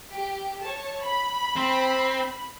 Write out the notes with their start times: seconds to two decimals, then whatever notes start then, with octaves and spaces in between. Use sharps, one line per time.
0.12 G4
0.61 C#5 A5
1.03 B5
1.56 C4